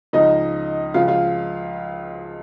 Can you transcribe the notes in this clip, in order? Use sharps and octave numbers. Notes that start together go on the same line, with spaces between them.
C#2 C#3 F3 D#4 D#5
C#2 C#3 F3 F4 F5
F4 F5